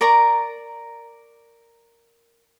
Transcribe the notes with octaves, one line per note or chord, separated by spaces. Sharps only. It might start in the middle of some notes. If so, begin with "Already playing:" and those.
A#4 D5 A#5 C#6